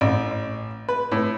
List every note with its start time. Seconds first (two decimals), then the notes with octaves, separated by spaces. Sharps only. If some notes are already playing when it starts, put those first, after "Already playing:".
0.01 A1
0.88 B4
1.12 A2